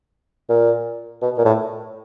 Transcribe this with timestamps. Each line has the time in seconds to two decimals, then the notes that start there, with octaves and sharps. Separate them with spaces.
0.49 A#2
1.22 B2
1.38 A#2
1.45 A2